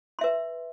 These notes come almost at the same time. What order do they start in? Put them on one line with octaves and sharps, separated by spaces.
C6 E5 B4